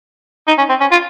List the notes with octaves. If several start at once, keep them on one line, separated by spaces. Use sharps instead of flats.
D#4
C#4
C4
C#4
F4